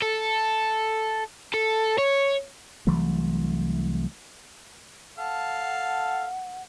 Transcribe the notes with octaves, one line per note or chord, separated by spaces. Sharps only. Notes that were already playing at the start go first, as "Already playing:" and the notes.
A4
A4
C#5
C2 E3 F#3 A3
A4 F5 F#5 A5